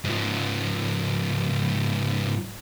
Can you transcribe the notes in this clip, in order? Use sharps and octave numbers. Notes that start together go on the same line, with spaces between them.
G#2 F3